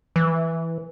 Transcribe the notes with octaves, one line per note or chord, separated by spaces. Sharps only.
E3